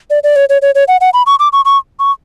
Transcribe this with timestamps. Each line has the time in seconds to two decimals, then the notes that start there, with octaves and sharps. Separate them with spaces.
0.10 D5
0.24 D5
0.36 C#5
0.49 C#5
0.62 C#5
0.75 C#5
0.88 F#5
1.01 F#5
1.14 B5
1.26 C#6
1.39 D6
1.53 C#6
1.65 C#6
1.99 C#6